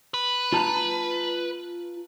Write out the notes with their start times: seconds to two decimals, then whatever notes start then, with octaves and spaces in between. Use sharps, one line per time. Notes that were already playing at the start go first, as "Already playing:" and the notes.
0.14 B4
0.53 F4 A5 A#5